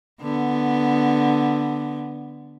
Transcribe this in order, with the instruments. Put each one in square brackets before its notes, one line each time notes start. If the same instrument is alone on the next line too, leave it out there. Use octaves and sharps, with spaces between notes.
[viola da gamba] D3 B3